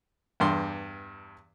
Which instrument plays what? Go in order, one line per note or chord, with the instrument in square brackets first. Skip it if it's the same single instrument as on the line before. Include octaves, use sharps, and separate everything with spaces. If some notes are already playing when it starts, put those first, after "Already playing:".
[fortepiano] E2 G2 C6